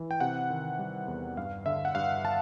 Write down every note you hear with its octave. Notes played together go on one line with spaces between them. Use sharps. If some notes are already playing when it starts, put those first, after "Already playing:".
Already playing: E3
G5
C3 F#5
D#3
G3
E2
G2 F5
D3 E5
F#5
G2 F5
A5